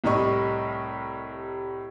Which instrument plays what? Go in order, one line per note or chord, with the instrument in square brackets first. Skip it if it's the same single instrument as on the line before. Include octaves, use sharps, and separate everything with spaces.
[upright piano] C2 A2 G3 D#5 B5 C#6